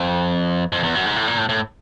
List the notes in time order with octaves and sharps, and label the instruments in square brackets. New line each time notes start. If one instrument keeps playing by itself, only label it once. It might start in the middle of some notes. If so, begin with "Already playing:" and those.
Already playing: [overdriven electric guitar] F2
F2
E2
F#2
G#2
A2
A#2
A2
A2